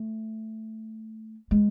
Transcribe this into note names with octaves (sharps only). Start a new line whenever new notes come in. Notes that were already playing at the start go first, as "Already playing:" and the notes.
Already playing: A3
G#3